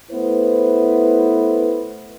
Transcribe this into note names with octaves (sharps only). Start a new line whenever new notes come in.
A3 B3 E4 B4 C5